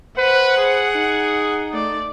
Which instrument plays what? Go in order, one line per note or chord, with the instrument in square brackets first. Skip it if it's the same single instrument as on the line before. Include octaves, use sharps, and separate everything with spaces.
[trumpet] B4 [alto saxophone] C5 [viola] F#5
[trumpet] G#4
[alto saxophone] D#4
[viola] A3 D5